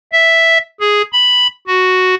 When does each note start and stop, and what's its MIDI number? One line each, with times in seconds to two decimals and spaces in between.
0.12 0.58 76
0.81 1.02 68
1.13 1.48 83
1.68 2.15 66